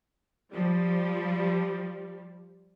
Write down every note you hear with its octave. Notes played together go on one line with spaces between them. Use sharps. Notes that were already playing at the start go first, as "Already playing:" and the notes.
F3 G3